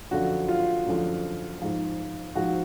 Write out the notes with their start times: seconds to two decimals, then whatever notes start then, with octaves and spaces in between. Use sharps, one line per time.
0.11 F#2 D3 F3 F#4
0.48 F4
0.86 F#2 D3 F3
1.62 G#2 F3
2.35 G#2 F3 F#4